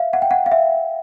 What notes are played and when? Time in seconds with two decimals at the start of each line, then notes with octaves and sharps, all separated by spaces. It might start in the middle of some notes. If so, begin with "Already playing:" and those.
Already playing: E5 F5
0.13 F#5
0.22 G5
0.31 F#5
0.46 F5
0.52 E5